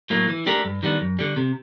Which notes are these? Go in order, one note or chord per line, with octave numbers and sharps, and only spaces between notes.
A2 F#3 A#3
E3
A3 D4 G4 A#4
G2
D#3 G3 B3 D4
F#2
D3 G3
C3